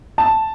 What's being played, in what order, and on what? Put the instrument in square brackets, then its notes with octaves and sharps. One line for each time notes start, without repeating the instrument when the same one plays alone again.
[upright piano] A5